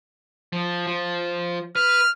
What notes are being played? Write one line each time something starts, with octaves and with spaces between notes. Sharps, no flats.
F3
F3
B4 F6